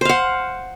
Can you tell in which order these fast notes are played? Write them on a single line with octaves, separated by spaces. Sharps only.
C5 F5 F#5